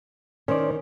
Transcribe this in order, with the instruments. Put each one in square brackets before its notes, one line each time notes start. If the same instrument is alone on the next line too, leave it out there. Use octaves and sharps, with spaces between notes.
[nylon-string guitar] D#3 [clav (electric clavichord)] C#4 C5 D5